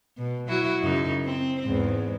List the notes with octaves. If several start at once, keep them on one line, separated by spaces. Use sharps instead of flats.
B2
F#3 E4 F#4
F#2 C#3 D#4
C4
E2 G#2